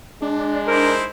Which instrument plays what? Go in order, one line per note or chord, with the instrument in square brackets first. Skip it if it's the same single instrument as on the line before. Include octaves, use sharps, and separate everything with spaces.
[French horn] G#3 [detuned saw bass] D4
[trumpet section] D#4 E4 C5 [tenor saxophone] A#4